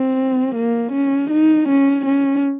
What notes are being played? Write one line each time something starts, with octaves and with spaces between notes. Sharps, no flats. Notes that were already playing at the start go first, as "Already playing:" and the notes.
Already playing: C4
A#3
C#4
D#4
C#4
C#4